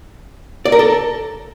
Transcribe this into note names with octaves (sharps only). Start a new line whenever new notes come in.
D5
A#4
A4